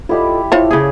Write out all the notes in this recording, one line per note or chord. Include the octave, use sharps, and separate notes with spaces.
E4 F4 G4 A4 D5 D#5
E4 F4 A4 C5 C#5 E5
C#3 G#4